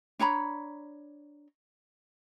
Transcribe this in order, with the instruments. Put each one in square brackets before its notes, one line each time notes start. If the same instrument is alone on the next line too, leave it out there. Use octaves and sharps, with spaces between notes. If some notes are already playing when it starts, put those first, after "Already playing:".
[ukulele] D4 C#5 A#5 B5